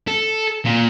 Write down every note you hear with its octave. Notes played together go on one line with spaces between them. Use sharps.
A4
A#2